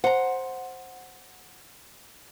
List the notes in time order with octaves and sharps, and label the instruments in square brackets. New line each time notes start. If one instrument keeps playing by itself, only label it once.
[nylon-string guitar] C5 [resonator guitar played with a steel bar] F#5 A#5